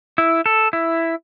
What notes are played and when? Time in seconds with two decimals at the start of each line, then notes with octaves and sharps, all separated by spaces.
0.18 E4
0.46 A4
0.73 E4